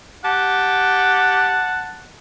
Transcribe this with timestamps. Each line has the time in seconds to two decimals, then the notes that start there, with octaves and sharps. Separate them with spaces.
0.24 G4 F#5 A5